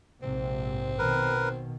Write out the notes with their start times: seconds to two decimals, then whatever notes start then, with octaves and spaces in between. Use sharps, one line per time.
0.23 A#1 G#2 C3 C4
0.99 B2 D#3 A#4 B4